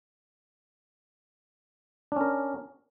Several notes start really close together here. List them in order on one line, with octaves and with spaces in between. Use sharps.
D4 C#4 A#4